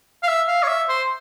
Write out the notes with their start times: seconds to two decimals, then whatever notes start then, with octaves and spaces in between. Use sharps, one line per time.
0.23 F5
0.28 E5
0.48 F5
0.63 C#5
0.68 E5
0.88 C5